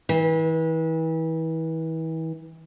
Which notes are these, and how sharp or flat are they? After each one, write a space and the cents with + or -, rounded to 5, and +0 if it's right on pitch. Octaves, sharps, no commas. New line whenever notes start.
E3 -35